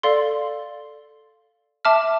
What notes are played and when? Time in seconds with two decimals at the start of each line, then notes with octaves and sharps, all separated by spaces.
0.03 A4 D5 F5 C6
1.85 E5 A5 D6 F6